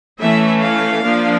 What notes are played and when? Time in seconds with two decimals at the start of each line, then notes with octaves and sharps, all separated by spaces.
0.20 E3 A3 C#4 E5
0.63 F5
1.04 F3 A#3 D4